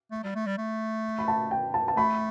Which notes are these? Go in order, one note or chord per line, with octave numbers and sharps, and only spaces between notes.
A3
G3
A3
G3
A3
B5
A5
G5
A5
A5
A3 B5